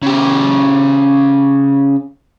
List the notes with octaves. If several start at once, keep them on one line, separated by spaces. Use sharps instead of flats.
C#3 G4